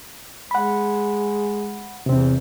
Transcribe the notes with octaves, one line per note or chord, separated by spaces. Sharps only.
G#3 F#5 B5
E2 C3 C4